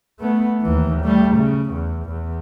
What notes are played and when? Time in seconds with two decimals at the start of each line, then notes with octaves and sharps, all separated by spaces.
0.19 A3 B3
0.61 D#2 E3
1.02 G3 A3
1.36 C#3
1.72 E2
2.05 E2